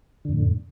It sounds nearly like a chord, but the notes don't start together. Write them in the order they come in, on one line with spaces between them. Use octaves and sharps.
D3 F2 A2